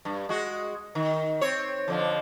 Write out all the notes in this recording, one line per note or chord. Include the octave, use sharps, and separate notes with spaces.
G2
G#3 F#4
D#3
C4 C#5
F2 D3 F3